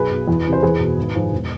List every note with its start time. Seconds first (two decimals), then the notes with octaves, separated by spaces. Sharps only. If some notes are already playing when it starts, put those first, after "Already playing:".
Already playing: B1 G#4 B4
0.11 B2
0.28 E2
0.46 C3 E3
0.53 C5
0.63 E2 G#4 B4
0.80 B2
0.97 G#1
1.15 G#2 F3
1.32 E1